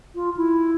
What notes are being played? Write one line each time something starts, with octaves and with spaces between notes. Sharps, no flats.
F4
E4